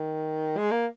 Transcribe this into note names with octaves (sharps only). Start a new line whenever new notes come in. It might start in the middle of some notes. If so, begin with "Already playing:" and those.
Already playing: D#3
G#3
A#3